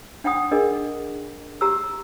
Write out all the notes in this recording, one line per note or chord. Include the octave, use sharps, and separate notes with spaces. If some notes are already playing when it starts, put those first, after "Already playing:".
D4 F#5 G5 B5 D#6
D4 G#4 A#4 D#5
G4 A#5 B5 E6